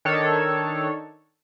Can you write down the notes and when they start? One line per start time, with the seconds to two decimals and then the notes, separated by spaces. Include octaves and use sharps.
0.05 D#3 D4 A4 C#5